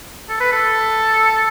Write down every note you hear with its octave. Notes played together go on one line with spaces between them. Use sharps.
A4
B4
A4